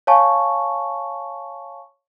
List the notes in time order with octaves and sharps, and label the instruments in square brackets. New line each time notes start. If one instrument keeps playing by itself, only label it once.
[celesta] C#5 F5 G#5 A5 C#6